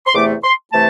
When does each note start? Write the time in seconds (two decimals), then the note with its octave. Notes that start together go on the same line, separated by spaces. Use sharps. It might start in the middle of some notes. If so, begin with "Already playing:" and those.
0.06 C6
0.14 E2 C3 E3 A3 D6
0.43 C6
0.72 C3 E3 A3 A5